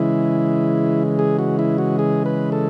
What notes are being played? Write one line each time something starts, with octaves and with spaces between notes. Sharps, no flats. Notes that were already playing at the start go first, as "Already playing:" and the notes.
Already playing: C#3 E3 G#3 E4
G#4
F#4
E4
F#4
G#4
B4
A4